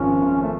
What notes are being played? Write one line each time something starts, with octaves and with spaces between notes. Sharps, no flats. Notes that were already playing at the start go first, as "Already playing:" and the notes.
Already playing: G#1 F3 C#4
G#1
A3